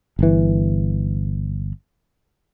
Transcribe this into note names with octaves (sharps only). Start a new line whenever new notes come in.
G1 E3